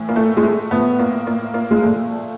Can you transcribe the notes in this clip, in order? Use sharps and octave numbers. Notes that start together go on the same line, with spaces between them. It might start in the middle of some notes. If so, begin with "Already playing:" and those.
Already playing: A2 E3
A#3
A3
G#3
A3
A2 F3 B3
A#3
A#3
A#3
G#3
A#2 F3 A3